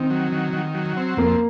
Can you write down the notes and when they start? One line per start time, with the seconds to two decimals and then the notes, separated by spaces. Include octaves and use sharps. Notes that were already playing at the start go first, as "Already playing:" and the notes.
Already playing: D#3 C4
0.10 F#3
0.32 D#3
0.53 D#3
0.75 F#3
0.97 C4
1.17 F2 A#3